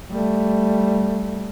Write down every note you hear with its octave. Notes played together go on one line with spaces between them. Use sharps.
G3 A3